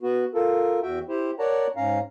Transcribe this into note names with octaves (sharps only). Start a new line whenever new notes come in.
B3 F#4
F4 A4 A#4
E2 F#4 E5 G5
E4 G4 C5
A#4 C#5 D5 F#5 A5 A#5
G#2 C#4 F5 A#5